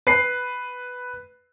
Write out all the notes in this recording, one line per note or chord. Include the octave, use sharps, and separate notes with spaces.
B4 C7